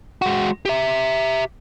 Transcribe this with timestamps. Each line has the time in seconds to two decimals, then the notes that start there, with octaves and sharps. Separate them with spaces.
0.22 G#3 F#4
0.65 G4 E5